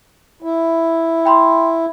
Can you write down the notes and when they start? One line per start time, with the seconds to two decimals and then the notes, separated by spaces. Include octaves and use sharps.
0.42 E4
1.25 G5 B5 C6